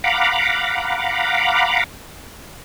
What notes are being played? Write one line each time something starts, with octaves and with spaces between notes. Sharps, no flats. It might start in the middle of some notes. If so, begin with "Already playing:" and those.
F5 F#5 A#5 B5 D6